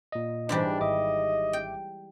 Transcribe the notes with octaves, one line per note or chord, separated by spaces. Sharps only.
A#2 D#5
G#2 E3 G3 D4
G#1 D#5 E5 D6
G5